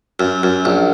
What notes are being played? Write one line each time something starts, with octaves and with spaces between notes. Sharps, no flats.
F#2
F#2
A#1